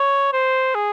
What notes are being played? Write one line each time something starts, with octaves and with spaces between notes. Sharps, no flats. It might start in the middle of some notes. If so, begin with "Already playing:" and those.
Already playing: C#5
C5
G#4